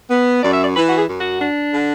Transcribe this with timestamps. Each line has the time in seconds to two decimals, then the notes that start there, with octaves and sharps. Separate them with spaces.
0.10 B3
0.43 F#2 D5
0.53 E5
0.64 D5
0.76 E3 B4
0.88 F#4
0.97 G#4
1.09 F#2
1.20 F#4
1.42 D4
1.74 D3